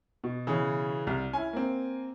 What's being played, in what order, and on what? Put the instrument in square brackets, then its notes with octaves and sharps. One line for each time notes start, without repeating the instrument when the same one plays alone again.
[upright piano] B2
[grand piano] C#3 E3 C#4
[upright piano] C2 G3 F6
[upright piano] C#4 E4 [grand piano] G#5
[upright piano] A#3 C4